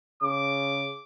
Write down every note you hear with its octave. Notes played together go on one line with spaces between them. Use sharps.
C#3 D6